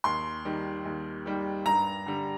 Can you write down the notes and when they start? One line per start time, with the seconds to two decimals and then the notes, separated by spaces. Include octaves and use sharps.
0.04 D#2 C6
0.45 D#3 G3
0.85 D#2
1.26 D#3 G3
1.66 G2 A#5
2.06 D3 G3